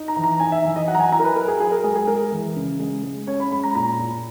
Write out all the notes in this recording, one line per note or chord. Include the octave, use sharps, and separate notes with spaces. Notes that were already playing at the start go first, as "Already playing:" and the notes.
Already playing: D#4
A#5
E3
A#5
D#4 G#5
E5
E3
D#5
F#3 F#5
A#5
G#5
E4 A#5
A#4
B4
F#3 A#4
G#4
F#3 G#4
A#4
G#3 G#4
G#4
G#3 A#4
E3
C#3
G#3
G#3
C#4 C#5
B5
G#3 B5
A#5
A#2 A#5
A#2